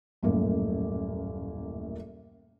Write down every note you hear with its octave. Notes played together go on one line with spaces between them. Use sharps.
D#1 F#2 A2 A#3